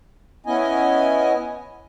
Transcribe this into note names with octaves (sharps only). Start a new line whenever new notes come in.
B3 C#4 E4 D#5 G#5